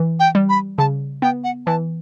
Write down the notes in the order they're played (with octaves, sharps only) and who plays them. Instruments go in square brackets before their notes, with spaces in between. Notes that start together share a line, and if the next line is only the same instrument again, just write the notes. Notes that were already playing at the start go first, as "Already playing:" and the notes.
Already playing: [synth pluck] E3
[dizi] G5
[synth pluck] G3
[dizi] B5
[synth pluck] C#3 [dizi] A5
[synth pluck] B3 [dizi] G5
[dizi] F#5
[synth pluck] E3 [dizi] A5